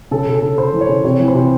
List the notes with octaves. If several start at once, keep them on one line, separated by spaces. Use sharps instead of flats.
C#3 A4
C#3
A4
C#3
C#3 C5
E3
C#5
C#3
C3 C#5
E3
C5
C3